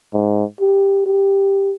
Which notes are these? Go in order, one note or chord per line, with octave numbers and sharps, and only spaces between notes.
G#2
G4
G4